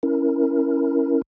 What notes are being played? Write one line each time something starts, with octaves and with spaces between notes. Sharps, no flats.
C#4 E4 A#4